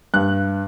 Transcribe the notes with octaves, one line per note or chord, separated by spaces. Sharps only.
G2 F#6